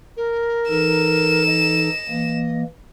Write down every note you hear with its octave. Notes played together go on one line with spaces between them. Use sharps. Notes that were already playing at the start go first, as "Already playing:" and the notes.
A#4
E3 D#4 A4 E7
D#5
E3 A#3